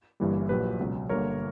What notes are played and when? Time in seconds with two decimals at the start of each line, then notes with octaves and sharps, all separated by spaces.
0.20 G1 G2 E3 G3 A#3
0.49 A#1 A#2 F#3 G4 B4
0.79 C#2 B2 F#3 B3
1.09 G1 G2 D3 A#3 A#4 C#5